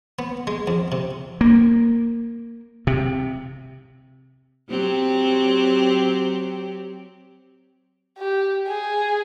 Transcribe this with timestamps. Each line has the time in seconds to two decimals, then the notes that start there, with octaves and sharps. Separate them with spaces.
0.19 B3
0.47 G#3
0.67 F2
0.92 C3
1.41 A#3
2.87 C3
4.70 F#3 C4 G4
8.18 G4
8.67 G#4